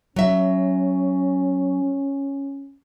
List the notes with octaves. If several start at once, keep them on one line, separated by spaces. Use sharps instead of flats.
F#3 C#4 E5